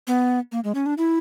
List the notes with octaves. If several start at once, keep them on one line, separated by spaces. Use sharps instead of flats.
B3
A#3
G#3
C#4
D4
E4